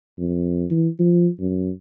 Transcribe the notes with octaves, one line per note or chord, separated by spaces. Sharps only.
F2
E3
F3
F#2